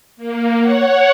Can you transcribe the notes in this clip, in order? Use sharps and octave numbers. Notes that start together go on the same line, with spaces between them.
A#3
C#5 F#5